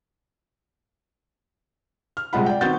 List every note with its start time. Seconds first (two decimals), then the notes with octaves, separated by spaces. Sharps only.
2.17 F6
2.33 C3 G3 G#3 F4 F#5 B5
2.46 D5 G5
2.61 D#3 B3 C4 F#4 G6 A6